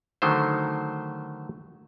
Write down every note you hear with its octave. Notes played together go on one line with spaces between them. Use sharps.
D3 D#3 F#3 A3 C5